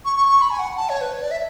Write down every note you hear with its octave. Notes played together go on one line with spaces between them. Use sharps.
C#6
C#6
C#6
B5
G#5
F#5
A5
C#5
B4
C#5
D5
E5